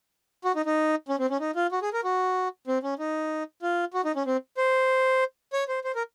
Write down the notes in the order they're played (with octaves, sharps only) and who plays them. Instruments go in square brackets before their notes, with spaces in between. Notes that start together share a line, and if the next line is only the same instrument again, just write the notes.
[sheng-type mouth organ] F#4
D#4
D#4
C#4
C4
C#4
D#4
F4
F#4
G#4
A#4
F#4
C4
C#4
D#4
F4
F#4
D#4
C#4
C4
C5
C#5
C5
C5
A#4